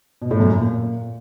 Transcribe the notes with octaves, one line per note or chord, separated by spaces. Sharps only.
B2
A2
F#2
A#2